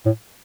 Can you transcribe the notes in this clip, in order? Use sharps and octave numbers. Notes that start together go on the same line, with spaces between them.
A2